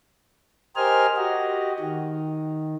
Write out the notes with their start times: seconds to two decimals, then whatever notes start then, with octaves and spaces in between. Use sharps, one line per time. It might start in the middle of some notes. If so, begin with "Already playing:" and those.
0.76 G4 A#4 C5 D#5 G#5 F6
1.17 F#4 G4 D#5
1.79 D#3